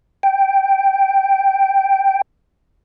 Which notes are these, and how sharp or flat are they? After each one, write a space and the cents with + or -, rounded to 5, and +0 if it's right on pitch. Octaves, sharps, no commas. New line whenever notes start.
G5 -5